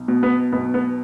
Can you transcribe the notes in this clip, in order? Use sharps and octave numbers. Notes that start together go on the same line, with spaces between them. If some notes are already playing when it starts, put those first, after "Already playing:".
Already playing: B1
B2
B3
B1 B3
B3